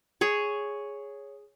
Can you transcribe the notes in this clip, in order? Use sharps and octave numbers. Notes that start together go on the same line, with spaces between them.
G#4 C#5